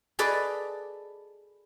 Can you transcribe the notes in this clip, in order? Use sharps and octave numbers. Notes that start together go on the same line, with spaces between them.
G#4 A4 B4 D5 D#5